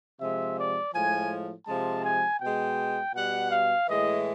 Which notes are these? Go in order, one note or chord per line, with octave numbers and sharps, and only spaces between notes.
C3 F3 G#3 E5
D5
A2 F3 G#3 G#5
C3 F3 G#3 A5
G#5
B2 G#3 G5
B2 G3 F#5
F5
A2 E3 G#3 D#5